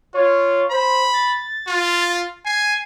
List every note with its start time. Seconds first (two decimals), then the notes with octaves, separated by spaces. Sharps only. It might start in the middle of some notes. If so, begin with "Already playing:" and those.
0.14 F4 C#5
0.71 C5 B5
1.13 A6
1.67 F4
2.45 G#5 C7